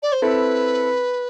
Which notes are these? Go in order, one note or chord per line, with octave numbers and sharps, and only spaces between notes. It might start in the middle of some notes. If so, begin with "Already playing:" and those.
D5
C5
C4 E4 A4 B4